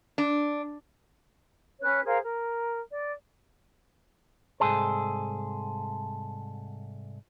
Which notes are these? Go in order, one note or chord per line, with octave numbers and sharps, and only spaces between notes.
D4
C#4 B4 C#5 F#6
G#4 A#4 C5 F5
A#4
D5
C2 F2 G#2 G#4 A4 C5